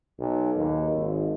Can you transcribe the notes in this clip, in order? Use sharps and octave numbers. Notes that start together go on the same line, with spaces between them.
B1
D#2
G#1